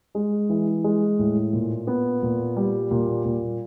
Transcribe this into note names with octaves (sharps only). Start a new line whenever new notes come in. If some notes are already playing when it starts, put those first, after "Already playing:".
G#3
E3
G#3
A2
A#2
B3
A#2
G3
A#2
A#2